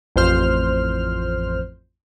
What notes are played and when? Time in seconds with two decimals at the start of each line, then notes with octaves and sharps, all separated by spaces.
0.16 A1 F2 C5 F6